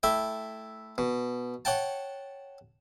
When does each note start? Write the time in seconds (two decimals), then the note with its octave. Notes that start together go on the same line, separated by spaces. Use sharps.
0.03 A3 E4 E5 G5
0.98 B2
1.65 C#5 F#5 G5 A5